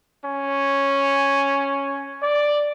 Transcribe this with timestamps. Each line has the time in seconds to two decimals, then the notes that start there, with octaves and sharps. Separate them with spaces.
0.25 C#4
2.22 D5